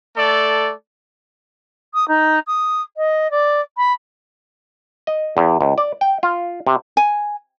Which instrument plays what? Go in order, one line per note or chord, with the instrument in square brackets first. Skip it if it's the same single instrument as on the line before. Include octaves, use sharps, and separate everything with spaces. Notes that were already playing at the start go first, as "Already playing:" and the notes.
[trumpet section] A3 A4 D5
[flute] D#6
D#4
D#6
D#5
D5
B5
[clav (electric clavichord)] D#5
E2
C#2
D5
G5
F4
C3
[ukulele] G#5